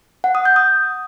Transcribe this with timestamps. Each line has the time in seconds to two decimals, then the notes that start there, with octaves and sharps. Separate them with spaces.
0.24 F#5
0.35 D#6
0.45 G6
0.56 D#6